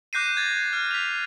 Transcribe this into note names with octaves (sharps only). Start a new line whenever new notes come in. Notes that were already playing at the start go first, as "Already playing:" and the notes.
D6 F#6 G6 A#6 C7 D#7
G#6 A6
F6
B6 F7